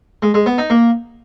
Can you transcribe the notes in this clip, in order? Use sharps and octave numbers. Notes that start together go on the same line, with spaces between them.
G#3
G#3
B3
D#4
A#3